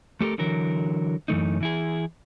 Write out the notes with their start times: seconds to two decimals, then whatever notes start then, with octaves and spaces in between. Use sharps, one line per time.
0.21 A3 G4 A4 A#4
0.38 D3 E3 F#3 A#4
1.28 F#2 E3 A3 D#4
1.61 E3 E4 G#4